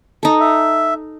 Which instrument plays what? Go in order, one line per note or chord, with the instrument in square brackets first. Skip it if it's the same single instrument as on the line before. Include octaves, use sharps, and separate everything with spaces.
[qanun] D#4 A4
[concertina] E5